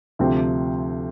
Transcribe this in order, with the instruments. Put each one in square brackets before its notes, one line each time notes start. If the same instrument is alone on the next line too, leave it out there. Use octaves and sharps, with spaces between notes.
[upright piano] D2 C3 F3 C4 G4